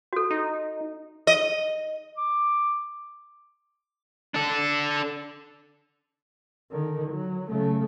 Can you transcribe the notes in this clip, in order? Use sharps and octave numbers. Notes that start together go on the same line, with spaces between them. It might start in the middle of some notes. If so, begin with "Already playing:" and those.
F#4 A4
D#4
D#5
D6
D4 A4
D3 D#3
F#3
C#3 A3